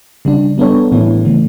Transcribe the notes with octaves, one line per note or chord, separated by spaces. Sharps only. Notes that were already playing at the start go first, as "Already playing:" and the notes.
C#3 G3 D4
G3 B3 D4 A4 C#5
A2 E3 B3 E4
C#3 E3 A3